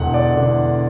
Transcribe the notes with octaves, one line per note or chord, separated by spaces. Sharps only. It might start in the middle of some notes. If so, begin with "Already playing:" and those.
Already playing: E1 E2 D3 F#5
D5
E1 E2 D3